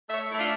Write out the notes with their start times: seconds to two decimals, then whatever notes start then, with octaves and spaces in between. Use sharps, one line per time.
0.08 A3 C#5 E5
0.28 A3 E4
0.37 D4 F4